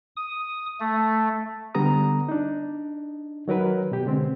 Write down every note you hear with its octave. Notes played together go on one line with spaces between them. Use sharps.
D#6
A3
D3 G3 B3 A#5 D#6
D4 D#4
D#3 F#3 A#4 B4
B2 G4
D3 G#3 C4